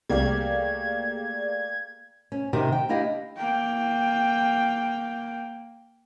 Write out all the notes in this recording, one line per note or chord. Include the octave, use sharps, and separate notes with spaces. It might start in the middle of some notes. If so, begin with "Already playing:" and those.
C2 A3 A#3 G4 G#4 D5 F5 G#6
C#4
C3 D#3 G4
G5
D4 E4 G4 D#5 F5
A#3 G5